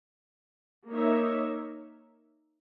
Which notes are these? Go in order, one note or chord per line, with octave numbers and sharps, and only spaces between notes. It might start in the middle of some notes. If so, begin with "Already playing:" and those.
A#3 D#4 A#4 C#5 E5